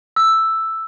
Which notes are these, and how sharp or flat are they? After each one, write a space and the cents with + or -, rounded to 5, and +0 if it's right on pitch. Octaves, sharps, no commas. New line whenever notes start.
E6 +0